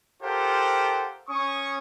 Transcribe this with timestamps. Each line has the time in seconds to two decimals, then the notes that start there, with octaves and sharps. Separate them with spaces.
0.23 F4 G4 A4 A#4 C5 F#5
1.28 C#4 C#6 D#6